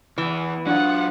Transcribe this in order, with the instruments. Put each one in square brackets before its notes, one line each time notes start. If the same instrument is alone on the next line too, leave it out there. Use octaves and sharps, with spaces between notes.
[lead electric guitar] E2 [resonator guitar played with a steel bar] E3
[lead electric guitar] F#3 F4 [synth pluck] D4 [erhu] F#5